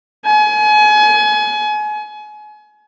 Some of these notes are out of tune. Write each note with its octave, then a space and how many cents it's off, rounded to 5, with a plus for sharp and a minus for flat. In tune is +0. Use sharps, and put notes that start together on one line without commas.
G#5 +30